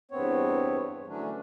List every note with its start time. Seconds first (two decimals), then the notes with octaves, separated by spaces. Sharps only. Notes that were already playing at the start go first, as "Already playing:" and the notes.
0.11 E2 G2 B3 C4 C#5
1.07 D3 E3 F#3 A3 C#4 D4